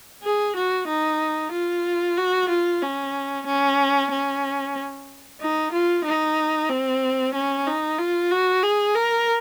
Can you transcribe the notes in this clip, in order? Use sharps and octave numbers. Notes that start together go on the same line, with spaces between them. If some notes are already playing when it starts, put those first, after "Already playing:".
G#4
F#4
D#4
F4
F#4
F4
C#4
C#4
C#4
D#4
F4
D#4
C4
C#4
D#4
F4
F#4
G#4
A#4